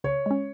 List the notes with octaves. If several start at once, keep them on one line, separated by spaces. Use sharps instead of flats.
C#3 C#5
G#3 C#4